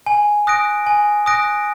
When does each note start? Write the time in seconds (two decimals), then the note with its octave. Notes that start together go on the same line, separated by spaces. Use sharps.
0.06 G#5
0.47 D#6 F#6 A#6 D7
0.86 G#5
1.26 D#6 F#6 A#6 D7